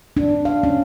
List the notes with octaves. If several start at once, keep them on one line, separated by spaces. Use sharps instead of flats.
D4
F5
C#4